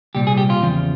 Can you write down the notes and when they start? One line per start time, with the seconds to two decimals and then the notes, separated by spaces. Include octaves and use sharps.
0.15 C2 A#2 G3 G4
0.27 G#4
0.38 G4
0.50 F4
0.61 E2 C#3 F3